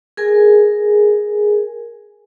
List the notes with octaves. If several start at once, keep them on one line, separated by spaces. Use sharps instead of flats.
G#4 A#4 G#5